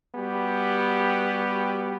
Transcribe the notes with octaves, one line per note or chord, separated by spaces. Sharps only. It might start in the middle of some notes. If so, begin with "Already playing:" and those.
G3 B3 F#4 G4